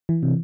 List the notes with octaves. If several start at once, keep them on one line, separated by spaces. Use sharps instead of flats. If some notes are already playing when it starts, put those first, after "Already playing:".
E3
C3